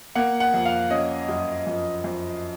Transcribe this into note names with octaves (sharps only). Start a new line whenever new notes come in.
A#3 F#5
F#5
F2
F5
C#4 D#5
F#2
F2
F2